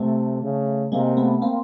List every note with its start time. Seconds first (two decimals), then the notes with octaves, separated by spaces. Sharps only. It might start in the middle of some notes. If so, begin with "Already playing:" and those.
Already playing: C3 A3
0.42 C#3
0.92 C3 G#3 A#3
1.17 A3 B3
1.42 A#3 C4